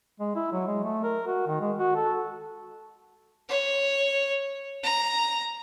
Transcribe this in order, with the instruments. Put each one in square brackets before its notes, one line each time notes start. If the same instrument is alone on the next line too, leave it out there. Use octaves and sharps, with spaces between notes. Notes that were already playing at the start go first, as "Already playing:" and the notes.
[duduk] G#3
E4
F#3
G#3
A3
A#4
F#4
D#3
G#3
F#4
A4
[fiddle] C#5
A#5